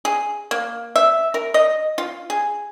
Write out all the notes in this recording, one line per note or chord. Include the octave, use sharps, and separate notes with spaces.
G#4
A#3
E5
A#4
D#5
F4
G#4